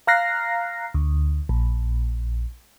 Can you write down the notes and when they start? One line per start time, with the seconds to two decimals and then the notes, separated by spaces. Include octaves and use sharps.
0.07 F5 A#5 F6 F#6 A#6 C7
0.94 D2
1.49 A#1